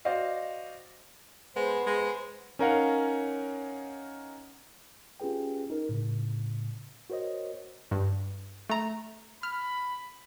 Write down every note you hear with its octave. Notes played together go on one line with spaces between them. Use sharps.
F#4 C5 D5 D#5 F5
G#3 B3 C5
G#3
C#4 D#4 A#4 C#5 F5 F#5
C#4 F4 G4 G#4 B4 G5
D#4 A#4
A2 C#3
F#4 A#4 C5 C#5 D#5
G2
A3 A#5
B5 F6